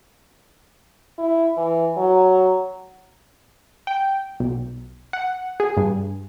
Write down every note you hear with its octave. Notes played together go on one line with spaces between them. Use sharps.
E4
E3
F#3
G5
B1
F#5
G#4
G2